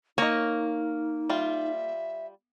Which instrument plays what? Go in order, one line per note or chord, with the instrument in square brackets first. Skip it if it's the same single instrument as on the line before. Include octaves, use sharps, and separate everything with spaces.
[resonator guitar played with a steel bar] A#3 [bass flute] D#4 [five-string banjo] C#5 D#5
[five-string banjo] G3 F4 [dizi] E5